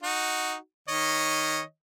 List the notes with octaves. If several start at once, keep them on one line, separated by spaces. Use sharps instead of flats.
D#4 F#4
D#3 C#5 D#5